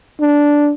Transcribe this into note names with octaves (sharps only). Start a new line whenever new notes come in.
D4